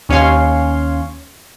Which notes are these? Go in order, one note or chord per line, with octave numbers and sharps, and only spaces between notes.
D#2 C#4 C#5 F5 C6